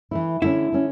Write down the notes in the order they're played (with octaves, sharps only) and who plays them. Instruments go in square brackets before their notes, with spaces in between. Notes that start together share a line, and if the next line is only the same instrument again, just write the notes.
[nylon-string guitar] E3 A3 E4
[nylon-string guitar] D3 A3 C#4 [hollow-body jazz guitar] E4
[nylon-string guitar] D3 A3 C#4